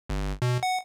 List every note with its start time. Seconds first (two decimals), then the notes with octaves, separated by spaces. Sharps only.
0.10 G1
0.42 B2
0.63 F#5